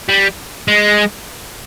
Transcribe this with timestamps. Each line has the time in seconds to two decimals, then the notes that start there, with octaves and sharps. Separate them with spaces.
0.09 G3
0.68 G#3